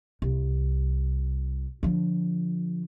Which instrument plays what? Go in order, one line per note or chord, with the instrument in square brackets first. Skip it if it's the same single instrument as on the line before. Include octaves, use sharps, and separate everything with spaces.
[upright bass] C2
D3 F3